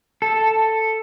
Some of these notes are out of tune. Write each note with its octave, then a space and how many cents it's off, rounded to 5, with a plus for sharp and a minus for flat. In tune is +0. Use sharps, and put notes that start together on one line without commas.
A4 +5